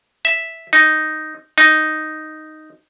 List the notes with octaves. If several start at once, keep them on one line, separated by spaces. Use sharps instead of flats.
E5
D#4
D#4